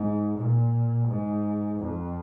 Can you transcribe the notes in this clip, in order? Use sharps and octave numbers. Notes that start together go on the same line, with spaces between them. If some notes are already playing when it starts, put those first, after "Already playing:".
Already playing: G#2
A#2
G#2
F2